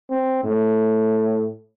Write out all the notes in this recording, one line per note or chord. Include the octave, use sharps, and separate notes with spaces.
C4
A2